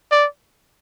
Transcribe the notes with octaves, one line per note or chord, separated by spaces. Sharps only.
D5